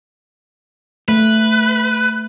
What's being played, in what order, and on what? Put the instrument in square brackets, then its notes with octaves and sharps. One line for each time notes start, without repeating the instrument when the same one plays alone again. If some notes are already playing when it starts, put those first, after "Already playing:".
[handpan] A3 [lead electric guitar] B4